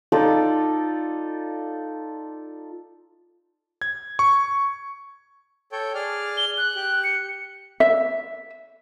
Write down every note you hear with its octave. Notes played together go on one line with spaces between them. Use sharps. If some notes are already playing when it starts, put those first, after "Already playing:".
D#4 F4 A4 D5
G#6
C#6
A4 C#5 G5
G#4 D5 F6
G7
F#6
G4
C#7
E5